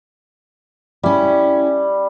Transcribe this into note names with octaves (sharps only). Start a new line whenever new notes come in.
G3 C#4 E4